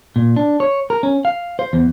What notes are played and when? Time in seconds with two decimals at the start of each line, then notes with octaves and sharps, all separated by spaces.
0.16 A#2
0.36 D4
0.60 C#5
0.90 A#4
1.03 C#4
1.25 F5
1.59 C5
1.73 E2